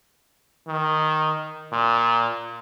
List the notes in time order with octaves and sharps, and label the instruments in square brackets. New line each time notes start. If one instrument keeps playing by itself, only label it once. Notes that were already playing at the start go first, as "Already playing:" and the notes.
[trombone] D#3
A#2